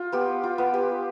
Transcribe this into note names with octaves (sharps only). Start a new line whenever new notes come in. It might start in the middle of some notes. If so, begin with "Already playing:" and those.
Already playing: F4
B3 G4
F4
B3
G4